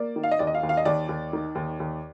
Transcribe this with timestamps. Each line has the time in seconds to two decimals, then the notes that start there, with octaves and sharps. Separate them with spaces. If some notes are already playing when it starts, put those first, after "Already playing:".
Already playing: A#3 D5
0.16 D#3
0.23 F5
0.31 D#5
0.39 D#2 D5
0.47 D#5
0.55 F5
0.63 D#2
0.69 F5
0.77 D#5
0.85 D#2 D5
1.09 D#2
1.33 D#3
1.55 D#2
1.80 D#2